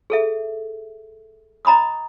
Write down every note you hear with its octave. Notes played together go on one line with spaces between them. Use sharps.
G#4 A4 E5
D#5 A#5 B5 D6 D#6